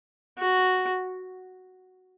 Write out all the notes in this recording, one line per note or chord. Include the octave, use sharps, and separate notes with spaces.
F#4